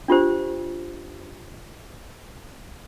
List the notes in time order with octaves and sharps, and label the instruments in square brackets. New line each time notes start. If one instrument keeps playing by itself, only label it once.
[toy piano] D4 F4 G4 C5